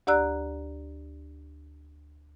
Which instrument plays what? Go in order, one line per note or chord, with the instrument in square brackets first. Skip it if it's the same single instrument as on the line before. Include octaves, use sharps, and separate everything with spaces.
[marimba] D2 G4 D5 A#5 E6 F#6